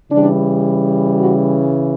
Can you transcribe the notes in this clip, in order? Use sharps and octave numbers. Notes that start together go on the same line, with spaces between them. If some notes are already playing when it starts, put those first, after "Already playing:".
C#3 E3 G3 D4 D5
F#4